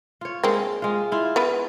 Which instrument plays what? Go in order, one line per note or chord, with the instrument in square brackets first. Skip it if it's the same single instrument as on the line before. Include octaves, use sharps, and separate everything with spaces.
[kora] F4 C#5
[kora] G#3 [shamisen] A#3 C4
[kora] G#3 F4
E4 F4
[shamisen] B3 B4